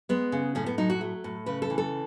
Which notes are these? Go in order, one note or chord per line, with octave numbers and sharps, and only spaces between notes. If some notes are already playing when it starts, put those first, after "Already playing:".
G#3 B3
C#3
A2 C#4
B3
F#3 D#4
F#4
A3
A2
C#3 B4
A4
E3
A4